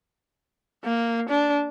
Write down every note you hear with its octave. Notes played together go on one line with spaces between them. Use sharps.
A#3
D4